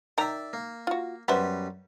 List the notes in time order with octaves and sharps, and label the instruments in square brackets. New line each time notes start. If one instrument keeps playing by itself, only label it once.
[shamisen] D#3 A#5 [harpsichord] D5 E5
[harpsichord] A#3
[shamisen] F4 F#4
[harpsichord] F#2 G3 B4 [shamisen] B3 C5 E5